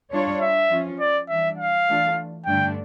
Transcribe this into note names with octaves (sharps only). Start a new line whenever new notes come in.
G3 D4 F4 C#5
E5
F3 C#4 F4
D5
E3 G3 D4 E5
F5
E3 A3 D4 F4
G2 D3 A3 D4 G5